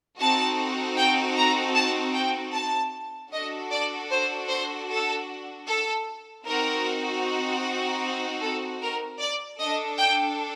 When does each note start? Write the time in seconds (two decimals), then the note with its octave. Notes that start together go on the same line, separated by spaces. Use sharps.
0.18 C4 D#4 F#4 A4 A5
0.96 G5
1.36 A#5
1.74 A5
2.14 G5
2.54 A5
3.31 D4 F#4 A4 D#5
3.71 D5
4.11 C5
4.49 C5
4.88 A4
5.67 A4
6.45 C4 D#4 F#4 A#4
8.41 A4
8.81 A#4
9.20 D5
9.59 D4 A4 D#5
9.98 G5